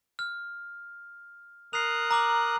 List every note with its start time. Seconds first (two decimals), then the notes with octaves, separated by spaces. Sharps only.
0.19 F6
1.73 A#4 D#6 F#6 C7 F7
2.11 A#5 D6 F#7